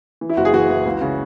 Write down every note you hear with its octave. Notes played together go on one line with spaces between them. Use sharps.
E3
E4
F#1 F#4
G#4
E3 F#4
E3
C#2
C#3